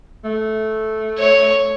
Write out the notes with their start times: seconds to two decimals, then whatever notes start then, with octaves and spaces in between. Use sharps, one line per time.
0.24 A3
1.18 C#5